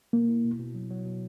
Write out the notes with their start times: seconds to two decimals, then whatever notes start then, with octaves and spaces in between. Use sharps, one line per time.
0.13 B2 A#3
0.29 E4
0.45 B2
0.60 B2
0.75 F#3
0.91 F#3
1.06 B2